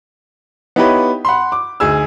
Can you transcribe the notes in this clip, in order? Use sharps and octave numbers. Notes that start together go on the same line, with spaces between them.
B3 D#4 E4 G4 B4 C#5
F#5 B5 C6
D6
D2 D#4 G#4 G#5 E6